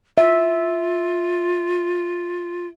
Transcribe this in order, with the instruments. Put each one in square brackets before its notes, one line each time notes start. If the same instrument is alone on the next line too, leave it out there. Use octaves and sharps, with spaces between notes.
[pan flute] F4 [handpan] E5